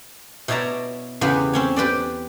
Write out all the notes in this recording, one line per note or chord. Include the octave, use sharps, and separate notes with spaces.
B2 E4 C#5 D5 A5 A#5
E2 C#3 B3 G4 B4
C4 C#4 C#5
G4 B4 C5 D5